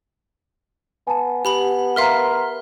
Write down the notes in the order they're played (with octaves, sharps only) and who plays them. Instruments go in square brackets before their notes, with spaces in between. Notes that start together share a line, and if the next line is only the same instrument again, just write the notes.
[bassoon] B3 [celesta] G#5 A5
[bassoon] B3 [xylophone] G4 B5 F#7
[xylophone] A#4 E5 F5 [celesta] A#5 C6 F6